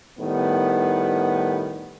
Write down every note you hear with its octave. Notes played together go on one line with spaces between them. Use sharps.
A2 D#3 G3 B3